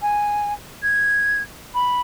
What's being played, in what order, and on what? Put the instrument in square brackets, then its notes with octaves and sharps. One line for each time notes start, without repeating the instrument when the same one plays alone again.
[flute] G#5
G#6
B5